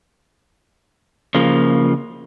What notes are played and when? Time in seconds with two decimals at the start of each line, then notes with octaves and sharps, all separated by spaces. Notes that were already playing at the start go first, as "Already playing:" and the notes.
1.35 C#3 F3 A#3 F4